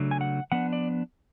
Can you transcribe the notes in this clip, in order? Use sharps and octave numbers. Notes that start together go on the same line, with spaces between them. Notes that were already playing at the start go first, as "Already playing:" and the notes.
Already playing: C#3 F#3 A3 D4
G#5
F#5
F3 B3 D4 F#5
D5